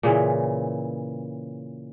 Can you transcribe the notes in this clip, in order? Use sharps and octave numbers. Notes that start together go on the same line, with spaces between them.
A#2 C#3 E3